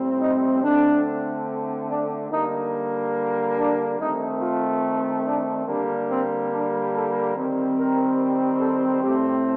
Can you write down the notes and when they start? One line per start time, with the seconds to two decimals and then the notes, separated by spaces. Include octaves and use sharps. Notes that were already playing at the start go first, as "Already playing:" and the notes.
Already playing: A2 G3 C4
0.20 D#4
0.61 D3 A3 C4 D4
1.88 D4
2.30 D3 G3 A#3 D#4
3.56 D4
3.98 D#3 A3 C4 D#4
4.40 F4
5.24 D4
5.67 D3 G3 A#3 D4
6.08 C4
6.51 D4
6.93 A4
7.35 D#3 G3 C4
7.76 A#4
8.60 A4
9.02 A2 A3 C4 G4